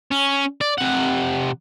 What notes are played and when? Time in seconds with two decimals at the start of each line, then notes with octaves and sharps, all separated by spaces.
0.12 C#4
0.61 D5
0.78 C3 F#5